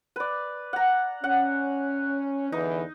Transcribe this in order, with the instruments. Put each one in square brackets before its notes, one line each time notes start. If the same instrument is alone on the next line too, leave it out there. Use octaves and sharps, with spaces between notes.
[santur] B4 D5
F#5 A#5
[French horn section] C#4 [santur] F#5
[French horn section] E2 D3 E3 [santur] D#4